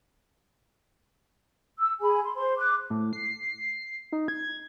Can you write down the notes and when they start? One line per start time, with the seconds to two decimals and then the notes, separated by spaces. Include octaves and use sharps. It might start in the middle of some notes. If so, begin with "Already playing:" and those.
1.79 E6
2.01 G#4 G#5 B5
2.24 C6
2.36 C5 C6
2.57 D6 F#6
2.90 A2
3.13 C7
4.12 D#4
4.28 G#6